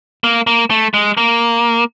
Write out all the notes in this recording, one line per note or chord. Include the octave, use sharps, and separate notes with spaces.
A#3
A#3
A3
G#3
A#3